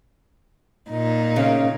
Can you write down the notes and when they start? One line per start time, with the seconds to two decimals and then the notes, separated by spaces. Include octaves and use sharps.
0.90 A#2 D#4
1.36 C#3 A#3 C#4